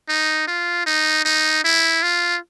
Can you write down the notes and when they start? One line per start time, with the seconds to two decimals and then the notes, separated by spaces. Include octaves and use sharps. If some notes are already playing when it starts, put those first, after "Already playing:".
0.09 D#4
0.48 F4
0.86 D#4
1.25 D#4
1.64 E4
2.03 F4